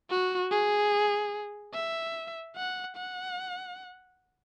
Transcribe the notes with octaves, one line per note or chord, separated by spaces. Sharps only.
F#4
G#4
E5
F#5
F#5